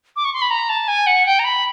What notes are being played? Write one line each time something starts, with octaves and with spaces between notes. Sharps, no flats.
D6
C#6
C6
B5
A#5
A5
G#5
F#5
G5
A#5
B5